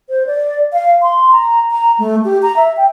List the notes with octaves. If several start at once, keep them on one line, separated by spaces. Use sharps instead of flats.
C5
D5
F5
C6
A#5
A#5
A3
G4
A#5
E5
G5